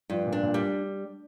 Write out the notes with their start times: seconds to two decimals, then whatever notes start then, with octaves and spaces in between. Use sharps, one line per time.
0.10 G2 F3
0.27 A#2
0.32 D4
0.43 A#2
0.54 G3